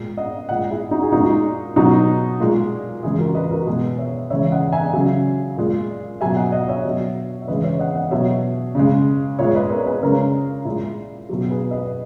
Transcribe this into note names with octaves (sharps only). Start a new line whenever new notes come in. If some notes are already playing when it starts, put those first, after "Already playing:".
Already playing: A#2 G#3
D#5 F#5
A#2 G#3 D#5 F#5
E4 G#4
D#4 F#4
G#4
A#2 G#3 D#4 F#4
B2 F#3 D#4 F#4
A#2 G#3
C#3 E3 G#3 E4 G#4
F#4 A#4
B4 D#5
F#4 A#4
B2 G#3 G#4 B4
C#5 E5
C#3 E3 G#3 C#5 E5
D#5 F#5
E5 G#5
C#3 F#3
A#2 G#3
B2 F#3 E5 G#5
D#5 F#5
D#5 F#5
C#5 E5
B2 F#3
E5
C#3 E3 G#3 B4 D#5
C#5 E5
D#5 F#5
D#5 F#5
B2 F#3 C#5 E5
C#3 G#3
A#2 G#3 C#5 E5
B4 D#5
A#4 C#5
G#4 B4
C#3 G#3 A#4 C#5
A#2 G#3 E4
B2 F#3
G#4 B4
B4 D#5